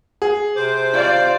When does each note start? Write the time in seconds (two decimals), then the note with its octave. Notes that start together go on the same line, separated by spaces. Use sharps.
0.22 G#4
0.56 C3 C5 D6
0.94 F4 D5